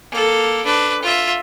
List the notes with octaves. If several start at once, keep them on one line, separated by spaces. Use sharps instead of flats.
A#3 A4
D4 B4
F4 E5